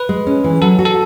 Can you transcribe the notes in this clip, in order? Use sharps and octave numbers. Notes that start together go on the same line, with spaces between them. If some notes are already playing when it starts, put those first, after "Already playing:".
Already playing: B4
G#3
C#4
E3
F#3 A4
F#4
A4